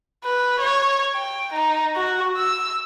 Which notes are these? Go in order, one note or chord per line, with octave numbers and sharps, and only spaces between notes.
B4
C#5
G5
D#4
F#4
E6